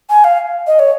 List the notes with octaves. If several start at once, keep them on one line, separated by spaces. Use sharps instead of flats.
G#5
F5
D#5
C#5